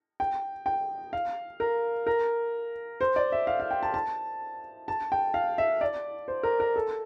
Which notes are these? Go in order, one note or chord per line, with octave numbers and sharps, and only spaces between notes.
G5
G5
F5
A#4
A#4
C5
D5
E5
F5
F5
G5
A5
A5
A5
G5
F5
E5
D5
C5
A#4
A#4
A4